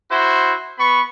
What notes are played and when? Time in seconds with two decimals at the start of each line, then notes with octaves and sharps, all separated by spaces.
0.11 E4 F#4 C5
0.79 B3 B5 C#6